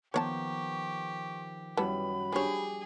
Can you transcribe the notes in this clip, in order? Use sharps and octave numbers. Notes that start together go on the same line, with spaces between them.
D#3 F3 B3 G4 C#5 D5 A5 C#6
F#2 E3 G3 B3 A5 B5
F3 D4 G4 G#4 C#5